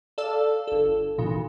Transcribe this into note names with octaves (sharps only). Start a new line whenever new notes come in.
A4 D5 F5 A5 E6
G1 A4
G#1 A#2 C#3 E3